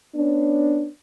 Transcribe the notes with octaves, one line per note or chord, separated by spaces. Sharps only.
B3 C#4 D4